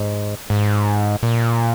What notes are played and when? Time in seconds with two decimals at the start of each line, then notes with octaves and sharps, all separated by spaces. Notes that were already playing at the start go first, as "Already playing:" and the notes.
Already playing: G#2
0.50 G#2
1.23 A#2